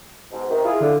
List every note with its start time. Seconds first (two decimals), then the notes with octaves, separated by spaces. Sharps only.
0.32 G#2 B2
0.51 C3 D#3
0.65 E4 F4 G#4
0.81 D3